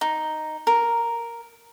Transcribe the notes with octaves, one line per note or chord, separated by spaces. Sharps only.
D#4
A#4